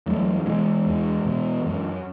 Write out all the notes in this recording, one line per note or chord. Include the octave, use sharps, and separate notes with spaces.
E2 F#3 A3
B2 E3 G#3
E2
B2
F#2